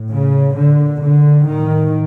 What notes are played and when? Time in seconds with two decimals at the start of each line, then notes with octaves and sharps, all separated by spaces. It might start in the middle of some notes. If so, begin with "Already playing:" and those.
Already playing: A2
0.12 C#3
0.57 A#2 D3
1.03 D3
1.48 A2 D#3